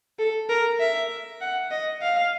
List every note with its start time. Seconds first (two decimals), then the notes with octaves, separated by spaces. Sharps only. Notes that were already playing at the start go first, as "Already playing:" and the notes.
0.19 A4
0.49 A#4
0.80 E5
1.41 F#5
1.71 D#5
2.02 F5